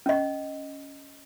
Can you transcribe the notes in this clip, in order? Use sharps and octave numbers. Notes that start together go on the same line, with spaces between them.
C#4 D#5